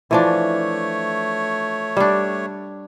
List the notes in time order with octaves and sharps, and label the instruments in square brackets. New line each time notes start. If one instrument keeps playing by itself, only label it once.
[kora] E3 F3 D4 [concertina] A3 C#5
[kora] G3 D4